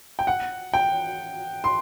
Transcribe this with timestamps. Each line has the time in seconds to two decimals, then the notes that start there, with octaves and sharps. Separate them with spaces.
0.19 G5
0.27 F#5
0.74 G5
1.64 C6